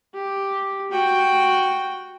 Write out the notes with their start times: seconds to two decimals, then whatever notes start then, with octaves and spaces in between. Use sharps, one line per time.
0.14 G4
0.91 F#4 G5